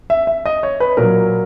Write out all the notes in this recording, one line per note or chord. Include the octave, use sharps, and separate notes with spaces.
E5
E5
D#5
C#5
B4
A#2 F#3 A#4